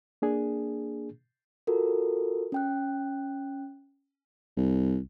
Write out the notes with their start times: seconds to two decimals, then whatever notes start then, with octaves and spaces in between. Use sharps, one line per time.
0.22 A#3 D4 G#4
1.67 F4 F#4 A4 A#4
2.52 C#4 G5 F#6
4.57 C2